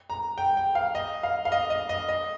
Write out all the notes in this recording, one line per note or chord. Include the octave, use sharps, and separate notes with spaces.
A#5
G5
G5
F5
D#5
F5
F5
D#5
D#5
D#5
D#5